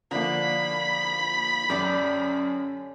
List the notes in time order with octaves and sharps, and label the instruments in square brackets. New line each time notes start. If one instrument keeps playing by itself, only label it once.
[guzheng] D3 [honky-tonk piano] F3 A#3 [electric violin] B5
[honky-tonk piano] F#2 [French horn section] C#4 [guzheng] G4 A4 D5